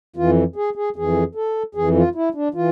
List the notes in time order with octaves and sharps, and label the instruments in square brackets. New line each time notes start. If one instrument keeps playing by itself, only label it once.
[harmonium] F2 E3 F4
G#4
G#4
F2 E3 G#4
A4
F2 E3 G#4
F4
E4
D4
E3 F4